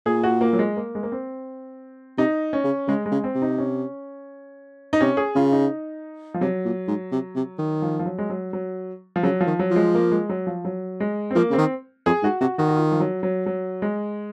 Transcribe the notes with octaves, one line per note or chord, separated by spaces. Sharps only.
A#2 G#4
F#4
A#3
F#3
G#3
A#3
G#3
A#3
C4
C3 D#4
C#4
C#3
C#3 G#3
G#3
C#3
C4
C3
D#4
C#4
D#4
C3 C#4
G#4
C#3 F4
D#4
F3
C3 F#3
A#2
G#2
C3
C3
D#3
F3
F3
F#3
G#3
F#3
F#3
F3
C#3 F#3
F3
D#3
F#3
F3
G#3
A#3
G#3
F#3
F3
F#3
G#3
C4
F3 A#3
C#3 C4
D#3
F2 G#4
G#2 F#4
C3 F#4
D#3 F#4
F#4
F4
F3
F#3
F#3
F#3
G#3